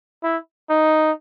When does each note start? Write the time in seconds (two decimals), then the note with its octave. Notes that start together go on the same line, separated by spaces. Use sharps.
0.23 E4
0.70 D#4